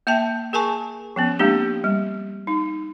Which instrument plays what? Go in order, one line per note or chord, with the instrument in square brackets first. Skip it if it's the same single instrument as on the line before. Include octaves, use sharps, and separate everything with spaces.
[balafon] A#3 E5 G5 A5
G#4 A#4 G#5 A5 C#6
F3 B3 C#4
G#3 A#3 C4 D4 G4
G3
D#4